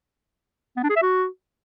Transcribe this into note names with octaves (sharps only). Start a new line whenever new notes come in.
B3
D4
G#4
E5
F#4